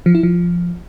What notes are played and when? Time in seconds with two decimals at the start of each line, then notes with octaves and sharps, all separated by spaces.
0.06 F3
0.15 E4
0.23 F3